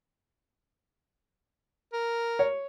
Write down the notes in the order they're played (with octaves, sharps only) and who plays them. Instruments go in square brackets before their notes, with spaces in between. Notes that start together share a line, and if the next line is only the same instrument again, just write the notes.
[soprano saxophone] A#4
[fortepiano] C#5